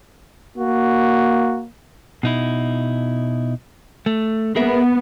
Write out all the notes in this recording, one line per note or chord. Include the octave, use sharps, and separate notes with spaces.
A#3 F#4
B2 D#4 E4
A3
B3 G#4 A#4 E5